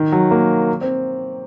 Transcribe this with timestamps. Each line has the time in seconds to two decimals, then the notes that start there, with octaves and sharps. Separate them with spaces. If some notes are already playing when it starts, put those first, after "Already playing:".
Already playing: D#3
0.12 F#3
0.31 A#3
0.81 C4